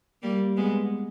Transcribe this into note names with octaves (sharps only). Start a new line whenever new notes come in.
G3 A#3
G#3 B3